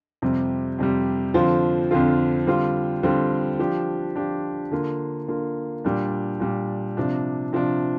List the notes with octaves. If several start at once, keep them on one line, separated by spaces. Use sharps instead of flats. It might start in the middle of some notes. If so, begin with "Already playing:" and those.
F2 C3 G3
F2 C3 G3
F2 D3 F3 C4 F4
F2 D3 F3 C4 F4
D3 G3 C4 F4
D3 G3 C4 F4
F3 D4 G4
F3 D4 G4
D3 A#3 F4
D3 A#3 F4
A#2 G3 D4
A#2 G3 D4
C3 F3 D4
C3 F3 D4